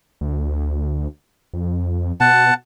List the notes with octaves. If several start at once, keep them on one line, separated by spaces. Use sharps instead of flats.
D2
F2
B2 F#5 A5